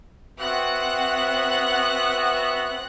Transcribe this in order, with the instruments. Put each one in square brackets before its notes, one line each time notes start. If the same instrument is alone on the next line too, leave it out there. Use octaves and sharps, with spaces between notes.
[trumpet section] B3 F#4 E5 [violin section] C4 F#5 F#6